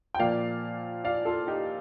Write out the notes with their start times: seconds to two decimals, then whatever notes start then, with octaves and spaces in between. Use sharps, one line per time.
0.14 G5
0.19 A#2 F3 A#3 D5 F5
1.04 D5 F5
1.25 F4 A4
1.47 D#4 G4